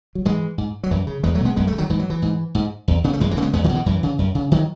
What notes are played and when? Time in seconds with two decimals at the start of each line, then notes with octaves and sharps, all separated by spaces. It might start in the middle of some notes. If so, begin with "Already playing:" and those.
0.15 F#3
0.25 G#2 E3 G#3
0.58 G#2
0.83 F#3
0.91 F#2 E3
1.07 C#3
1.23 E2 E3 G#3
1.35 F#3 A3
1.40 B2
1.45 G#3 B3
1.56 F#2 G#3 B3
1.67 F#3 A3
1.72 C#3
1.78 D#3 F#3
1.90 G#2 E3
1.99 F#3
2.10 E3
2.22 G#2
2.55 G#2
2.88 E2
3.04 C#3 B3
3.13 A3
3.20 F#2 E3 G#3
3.31 E3 G#3
3.37 C#3 A3
3.42 G#3 B3
3.53 E2 G#3 B3
3.64 D#3 F#3
3.69 B2
3.75 E3
3.86 F#2 E3
4.03 C#3
4.18 F#2
4.35 C#3
4.52 D#3 F#3